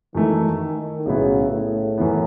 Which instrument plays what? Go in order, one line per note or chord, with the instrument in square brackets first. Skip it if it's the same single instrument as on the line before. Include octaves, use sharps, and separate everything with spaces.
[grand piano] F#2 E3 A3 [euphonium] D#3
[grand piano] B1 A2 F#3 B3 E4 [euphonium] C#3
[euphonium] A2
[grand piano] F#2 E3 B3